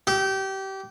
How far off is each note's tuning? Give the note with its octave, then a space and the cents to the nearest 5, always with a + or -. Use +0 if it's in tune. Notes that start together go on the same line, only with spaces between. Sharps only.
G4 -25